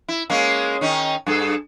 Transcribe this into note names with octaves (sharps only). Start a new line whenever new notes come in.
E4
G#3 A#3 C#4
D#3 C#4 D#4
G2 G#4 A4